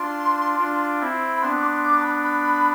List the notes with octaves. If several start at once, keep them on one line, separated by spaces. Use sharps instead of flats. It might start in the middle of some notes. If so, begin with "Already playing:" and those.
Already playing: D4 F4 C6
D4 F4
C4 E4
B5
B3 D4 C6
D6
C6
D6
A5
B5
B5